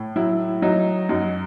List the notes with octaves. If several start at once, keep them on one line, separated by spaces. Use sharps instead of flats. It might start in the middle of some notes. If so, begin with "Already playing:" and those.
Already playing: A2
F#3 E4
F#3 D#4
F#2 D#4